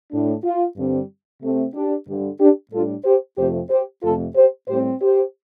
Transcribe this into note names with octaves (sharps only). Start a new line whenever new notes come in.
A2 A3 D4
F4
G2 D3 G3 C4
C3 A3 C4
D4 G4
G2 D3 G3
D4 G4
A2 G3 D4 F4 A4
G4 C5
F2 C3 F3 A3 C4 G4 C5
G4 C5
F2 C3 A3 F4 A4
G4 C5
A2 G3 C4 G4 C5
G4 C5